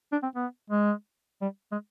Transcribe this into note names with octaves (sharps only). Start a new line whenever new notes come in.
D4
C4
B3
G#3
G3
G#3